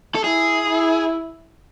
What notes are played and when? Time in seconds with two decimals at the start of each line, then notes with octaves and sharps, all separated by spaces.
0.15 A4
0.24 E4 G#4
0.69 E4